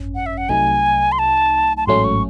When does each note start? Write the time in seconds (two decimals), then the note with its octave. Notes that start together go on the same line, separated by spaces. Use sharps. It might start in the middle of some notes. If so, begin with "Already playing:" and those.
Already playing: G#1 F#2 C#4
0.15 F#5
0.26 E5
0.37 F#5
0.49 C2 C3 F#3 A3 D#4 G#5
1.12 C6
1.19 A5
1.77 A5
1.87 A1 G#2 F#3 A3 C#4 C6
2.04 C#6